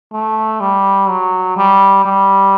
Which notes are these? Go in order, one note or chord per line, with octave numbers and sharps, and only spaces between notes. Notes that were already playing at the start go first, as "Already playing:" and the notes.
A3
G3
F#3
G3
G3